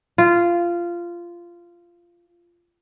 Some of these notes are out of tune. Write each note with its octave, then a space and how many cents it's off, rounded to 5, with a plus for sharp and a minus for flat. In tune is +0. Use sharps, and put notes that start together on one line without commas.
F4 -15